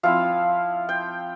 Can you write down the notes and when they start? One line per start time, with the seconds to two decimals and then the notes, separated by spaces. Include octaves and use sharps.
0.03 F3 C4 E4 F5
0.89 G5